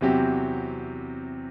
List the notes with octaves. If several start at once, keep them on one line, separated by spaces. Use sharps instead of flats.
E2 C3 F#3 C4 G4